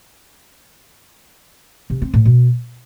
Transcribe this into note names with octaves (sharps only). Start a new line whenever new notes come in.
C3
C4
A2
B2